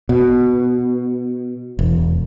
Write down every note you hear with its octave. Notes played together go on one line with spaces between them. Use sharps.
B2
E1